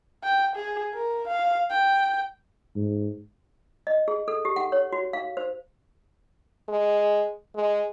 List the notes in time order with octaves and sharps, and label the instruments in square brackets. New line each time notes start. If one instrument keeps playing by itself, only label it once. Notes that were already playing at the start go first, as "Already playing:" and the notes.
[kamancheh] G5
G#4
A#4
F5
G5
[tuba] G#2
[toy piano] D#5
G#4
A4
G4
F#5
C#5
F#4
F5
C5
[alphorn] G#3
G#3